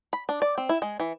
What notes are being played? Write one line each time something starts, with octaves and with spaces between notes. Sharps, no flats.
B5
D4
D5
C4
E4
G#3
E3